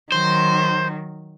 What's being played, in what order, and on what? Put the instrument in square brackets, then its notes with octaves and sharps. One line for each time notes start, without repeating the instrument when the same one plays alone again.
[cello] D#3 F#3 [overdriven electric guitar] C5